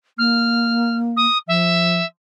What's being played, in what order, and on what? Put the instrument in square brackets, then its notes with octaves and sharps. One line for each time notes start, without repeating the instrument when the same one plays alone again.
[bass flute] A#3 [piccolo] F6
[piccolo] D#6
[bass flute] F3 [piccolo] E5